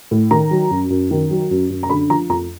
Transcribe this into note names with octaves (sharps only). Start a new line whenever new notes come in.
A2
D#3 A#5
F#3
F#2
F#2
D#3
F#3
F#2
F#2
A#5
D3 B5
F3 A#5
F2 A#5